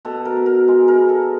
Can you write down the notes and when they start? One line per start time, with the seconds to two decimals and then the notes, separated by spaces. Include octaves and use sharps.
0.05 B2 A4
0.25 A#4
0.36 B2
0.46 A#4
0.68 G#3
0.88 A#4
0.98 B3
1.09 A4